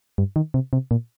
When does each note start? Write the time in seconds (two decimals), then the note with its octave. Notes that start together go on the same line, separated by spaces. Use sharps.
0.18 G2
0.36 D#3
0.54 C3
0.73 C3
0.91 A#2